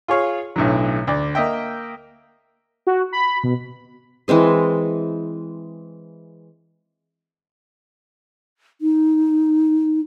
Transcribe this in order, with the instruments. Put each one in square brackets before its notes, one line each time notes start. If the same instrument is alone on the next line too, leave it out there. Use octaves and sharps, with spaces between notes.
[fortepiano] F4 G#4 C#5 F5
B1 A2 D3 F#3
D2 D5
A#3 D#5 E5 G5
[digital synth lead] F#4
B5
B2
[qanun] E3 G#3 C4 G#4
[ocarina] D#4